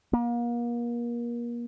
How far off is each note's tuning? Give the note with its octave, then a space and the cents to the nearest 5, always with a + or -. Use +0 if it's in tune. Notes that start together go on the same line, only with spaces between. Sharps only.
A#3 +35